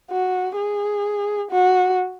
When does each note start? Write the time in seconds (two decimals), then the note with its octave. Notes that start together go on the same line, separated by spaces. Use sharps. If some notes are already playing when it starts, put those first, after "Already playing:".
0.11 F#4
0.57 G#4
1.51 F#4